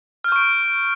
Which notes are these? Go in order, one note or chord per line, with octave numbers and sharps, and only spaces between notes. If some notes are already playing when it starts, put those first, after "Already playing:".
C#6 F6 G6 D7